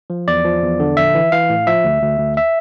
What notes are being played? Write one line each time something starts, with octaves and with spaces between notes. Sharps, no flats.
F3
E2 D5
F3
E2
D3
A#1 E5
E3
E3 F5
A2
F3 E5
D2
D2
D2
E5